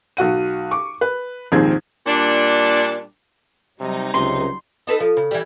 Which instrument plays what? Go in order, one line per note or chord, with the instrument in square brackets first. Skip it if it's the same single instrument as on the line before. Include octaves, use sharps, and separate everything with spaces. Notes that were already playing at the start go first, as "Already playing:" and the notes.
[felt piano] B1 F#4 F#5 D#7
C#6 D6
B4
A#1 D#2 G#2 C4 G#4 G#6
[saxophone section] A#2 G3 D4
[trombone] C3 [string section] F#3 G3 D#4
[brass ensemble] C#2 [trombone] C3 [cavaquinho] C6
[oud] D#4 A4 B4
F3
C#3
E3 G3